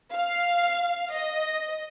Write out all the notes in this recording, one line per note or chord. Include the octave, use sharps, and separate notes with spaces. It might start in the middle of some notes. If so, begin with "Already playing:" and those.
F5
D#5